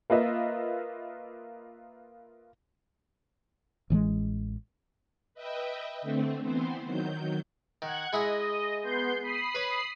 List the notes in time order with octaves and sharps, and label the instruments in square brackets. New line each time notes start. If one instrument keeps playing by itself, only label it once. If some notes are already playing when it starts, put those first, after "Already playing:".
[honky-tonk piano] A#3 F4 B4 D#5 E5
[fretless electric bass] A1 E3 G3 G#3
[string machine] B4 D#5 E5 G5
D3 A3 C4
E3 B3 C4 C5
D#3 F#3 G6
[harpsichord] D#3 [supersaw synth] F#5 F#6 G#6
[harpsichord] G#3 E4 G#4 [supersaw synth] D#5
[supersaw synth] B3 C6 G6
B5 D#6 C7
[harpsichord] B4 C#5